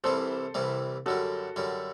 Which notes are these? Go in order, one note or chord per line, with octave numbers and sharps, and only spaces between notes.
C2 C3 E3 G3 A4 C5
C2 C3 E3 G3
F#2 D3 G3 F#4 A4
F#2 D3 G3